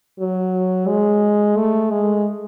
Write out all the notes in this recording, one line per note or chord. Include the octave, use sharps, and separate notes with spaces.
F#3
G#3
A3
G#3